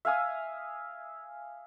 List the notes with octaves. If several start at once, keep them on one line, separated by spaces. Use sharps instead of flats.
E5 F5 G#5 D#6